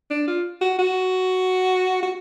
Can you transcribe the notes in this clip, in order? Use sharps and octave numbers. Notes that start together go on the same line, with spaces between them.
D4
F4
F#4
F#4
F#4